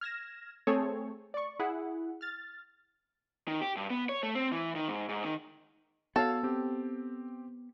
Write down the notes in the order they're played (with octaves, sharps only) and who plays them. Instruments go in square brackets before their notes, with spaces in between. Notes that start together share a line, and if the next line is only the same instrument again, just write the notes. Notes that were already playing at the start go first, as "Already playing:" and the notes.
[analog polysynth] F6 G#6 A#6 E7
A3 C4 G#4 A4 C#5
D5 C#6
E4 G#4 F#5
F6 A6
[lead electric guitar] D#3
G4
G2
B3
C#5
A3
C4
E3
D#3
G#2
G#2
D#3
[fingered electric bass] B3 [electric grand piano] F#4 C#5 F5 [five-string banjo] A4
[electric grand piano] C4 G4